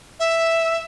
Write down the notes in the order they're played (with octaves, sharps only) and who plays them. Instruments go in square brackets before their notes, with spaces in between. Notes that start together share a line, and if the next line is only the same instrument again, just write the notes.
[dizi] E5